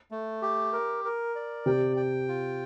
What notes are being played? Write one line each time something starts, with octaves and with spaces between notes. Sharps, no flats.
A3
G4
A#4
A#4
D5
C3 G5
G5
F4